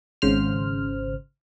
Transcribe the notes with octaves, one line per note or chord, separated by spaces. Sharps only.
G#1 C#3 C5 F6